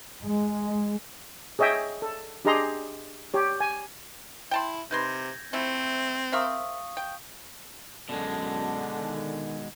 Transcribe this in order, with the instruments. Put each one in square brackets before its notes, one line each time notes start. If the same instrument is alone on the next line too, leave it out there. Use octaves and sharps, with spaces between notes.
[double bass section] G#3
[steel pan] G#4 C#5 D#5 E5 G5
A4
D4 G4 G#4 D#5 A#5 C6
G4 C#5
G#5
[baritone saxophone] E4 [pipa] G5 A5 C6
[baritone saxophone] C3 [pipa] D#4 B4 C6 [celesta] G6 G#6 A#6
[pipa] F3 A3 E4 [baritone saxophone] C4
[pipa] A#4 C5 E5 [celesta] F5 C#6 D#6
[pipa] G5
[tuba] F#2 [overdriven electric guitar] B2 G#3 [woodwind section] D3 [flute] A5
[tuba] D#3